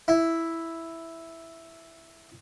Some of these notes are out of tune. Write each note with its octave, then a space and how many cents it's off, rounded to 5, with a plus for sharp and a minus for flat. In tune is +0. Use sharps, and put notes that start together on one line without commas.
E4 +0